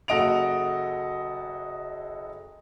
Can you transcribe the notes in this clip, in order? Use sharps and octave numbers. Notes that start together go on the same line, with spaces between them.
F#1 F#4 A4 D#5 D7 F7